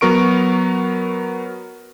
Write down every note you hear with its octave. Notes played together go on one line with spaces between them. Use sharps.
F#3 B3 A#4 C#6 D7